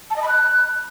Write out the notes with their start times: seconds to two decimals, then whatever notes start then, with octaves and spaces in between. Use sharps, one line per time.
0.10 A5
0.16 D#5
0.22 B5
0.28 F#6